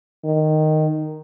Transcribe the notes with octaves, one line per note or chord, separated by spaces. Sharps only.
D#3